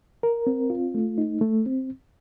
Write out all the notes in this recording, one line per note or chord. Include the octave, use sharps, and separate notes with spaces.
A#4
C4
F4
A3
D#4
A3
C4